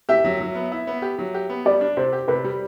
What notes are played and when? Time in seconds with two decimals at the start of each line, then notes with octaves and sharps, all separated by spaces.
0.09 G4 E5
0.24 F#3
0.41 F#3
0.55 B3
0.72 E4
0.87 B3
1.02 G4
1.19 F#3
1.34 G4
1.50 B3
1.65 G3 D5
1.81 D4
1.97 C3 C5
2.13 G4
2.28 C3 B4
2.44 G3